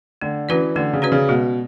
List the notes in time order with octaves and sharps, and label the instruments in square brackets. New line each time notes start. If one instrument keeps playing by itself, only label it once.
[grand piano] D3 [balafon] A3
[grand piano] E3 [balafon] C#4 F#4 B4 D5
[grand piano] D3 [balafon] A3
[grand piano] C#3
[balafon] C#4 F#4 B4 D5
[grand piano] C#3
[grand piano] B2 [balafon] G#3